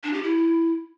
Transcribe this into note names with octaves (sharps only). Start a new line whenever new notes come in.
D4
G4
E4